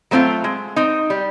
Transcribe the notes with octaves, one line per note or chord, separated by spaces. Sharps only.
F#3 A3 C4 F4
G#3
C4 D#4
G3